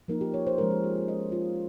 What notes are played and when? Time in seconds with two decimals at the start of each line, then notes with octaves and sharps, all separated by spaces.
0.08 F3 A#3 D#4 A#4
0.21 G4
0.34 C#5
0.47 C5
0.58 F3 G#3 C#4 F4 A#4
0.71 G#4
0.84 G#4
0.96 A#4
1.08 F3 G#3 C#4 F4 D#5
1.32 F4